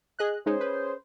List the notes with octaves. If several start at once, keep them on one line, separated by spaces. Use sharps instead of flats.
G#4 D#5 F#6
G#3 C#4 D#4 G#4 C5
B4